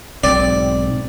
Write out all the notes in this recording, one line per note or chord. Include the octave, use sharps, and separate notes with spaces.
B1 G#2 C4 D5